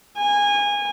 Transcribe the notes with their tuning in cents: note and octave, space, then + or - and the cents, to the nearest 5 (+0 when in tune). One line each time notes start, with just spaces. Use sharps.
G#5 -20